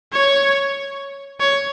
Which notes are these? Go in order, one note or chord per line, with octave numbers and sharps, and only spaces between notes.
C#5
C#5